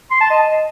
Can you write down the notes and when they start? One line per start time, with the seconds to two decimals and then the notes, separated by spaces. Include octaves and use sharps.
0.11 C6
0.21 A5
0.31 D#5